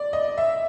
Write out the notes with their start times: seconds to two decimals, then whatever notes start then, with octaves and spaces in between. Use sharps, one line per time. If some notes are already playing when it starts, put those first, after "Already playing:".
Already playing: D5
0.13 D#5
0.38 E5